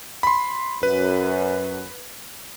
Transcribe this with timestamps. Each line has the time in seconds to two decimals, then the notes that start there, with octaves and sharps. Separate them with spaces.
0.23 B5 C6
0.83 F#2 B4